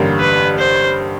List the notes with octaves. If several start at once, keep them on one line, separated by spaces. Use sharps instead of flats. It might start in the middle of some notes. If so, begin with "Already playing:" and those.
Already playing: A1 G2 D3 G3 A#3
B4
C5